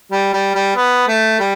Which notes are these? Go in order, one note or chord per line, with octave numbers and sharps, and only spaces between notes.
G3
G3
G3
B3
A3
G3